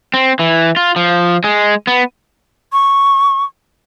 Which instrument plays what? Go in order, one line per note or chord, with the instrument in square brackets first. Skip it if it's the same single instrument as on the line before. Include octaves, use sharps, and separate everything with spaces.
[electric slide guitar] C4
E3
F4
F3
G#3
B3
[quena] C#6